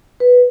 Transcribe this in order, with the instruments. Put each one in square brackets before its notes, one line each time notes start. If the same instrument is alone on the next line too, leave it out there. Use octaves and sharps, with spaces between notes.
[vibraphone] B4